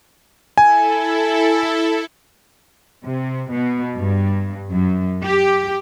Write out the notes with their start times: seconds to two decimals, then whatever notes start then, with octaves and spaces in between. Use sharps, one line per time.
0.58 E4 A4 G#5
3.04 C3
3.52 B2
3.98 G2
4.71 F#2
5.24 G4